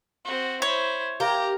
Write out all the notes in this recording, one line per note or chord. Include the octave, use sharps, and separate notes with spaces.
C4 F#4
E4 C5 C#5
A#3 G4 A#5